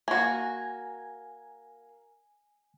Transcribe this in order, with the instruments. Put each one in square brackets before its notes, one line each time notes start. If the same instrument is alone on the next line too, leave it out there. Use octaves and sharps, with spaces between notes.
[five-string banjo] A#3 F#4 [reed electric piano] G#5 G#6